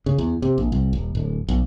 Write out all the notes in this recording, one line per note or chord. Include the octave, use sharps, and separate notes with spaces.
C#3
E2
C3
A#1
C2
D#1
D1
B1